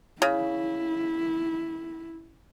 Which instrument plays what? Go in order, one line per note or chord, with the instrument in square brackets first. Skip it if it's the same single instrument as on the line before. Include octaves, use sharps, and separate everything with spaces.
[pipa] C#3 [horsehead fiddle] E4